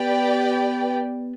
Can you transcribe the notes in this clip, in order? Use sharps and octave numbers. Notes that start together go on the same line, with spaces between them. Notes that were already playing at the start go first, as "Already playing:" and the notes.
Already playing: B3 G4 B4 D5 G5